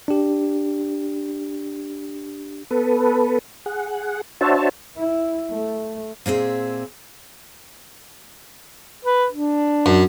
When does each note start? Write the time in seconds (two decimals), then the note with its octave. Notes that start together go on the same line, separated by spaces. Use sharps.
0.08 D4 G4
2.71 B3 A4 B4
3.66 G#4 F#5
4.41 D4 F#4 C5 C#5 E5 A5
4.97 E4
5.51 A3
6.26 A#2 C4 G#4 E5
9.05 B4
9.32 D4
9.86 F#2